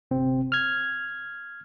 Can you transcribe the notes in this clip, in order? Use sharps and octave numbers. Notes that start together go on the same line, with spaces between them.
G1 C3 C4
F6 G#6